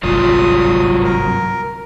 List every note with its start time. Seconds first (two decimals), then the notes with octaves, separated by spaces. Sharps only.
0.03 G1 C2 G#2 F#3 F4 D5 D#6
1.03 A#4